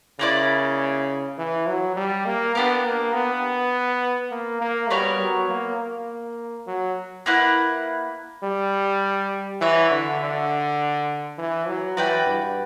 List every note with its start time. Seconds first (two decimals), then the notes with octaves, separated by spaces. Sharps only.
0.19 C#3 A#3 E4 B4 D5
1.38 E3
1.67 F#3
1.97 G3
2.26 A#3
2.55 B3 D4 G4 A#4
2.85 A#3
3.13 B3
4.32 A#3
4.61 A#3
4.90 G3 B3 F#4 A#4 C#5
5.20 F#3
5.50 A#3
5.79 A#3
6.67 F#3
7.26 A#3 E4 B4 F#5
8.43 G3
9.61 E3 F#4 C#5 E5
9.91 D3
10.20 D3
11.38 E3
11.68 F#3
11.97 E3 F#4 B4 D5 G5
12.26 G2